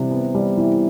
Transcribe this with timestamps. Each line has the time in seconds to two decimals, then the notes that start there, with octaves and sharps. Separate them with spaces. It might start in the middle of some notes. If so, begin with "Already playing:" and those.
Already playing: C3 E3 G3
0.11 B3
0.35 G3
0.57 E3